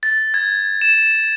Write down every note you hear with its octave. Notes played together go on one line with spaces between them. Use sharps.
A6
G#6
E7